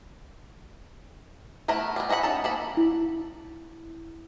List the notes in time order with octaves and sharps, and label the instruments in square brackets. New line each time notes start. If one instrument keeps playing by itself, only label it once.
[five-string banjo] A3 B3 E4 A#4 B4
G3 G#3
E3 D#5 E5 F#5 B5
C#4 D#4 A5
A#3 A4 B5
[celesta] E4